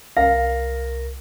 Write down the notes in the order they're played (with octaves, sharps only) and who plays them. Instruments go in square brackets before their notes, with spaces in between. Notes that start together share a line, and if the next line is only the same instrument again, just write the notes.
[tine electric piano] C2 A#4 A#6 [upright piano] F5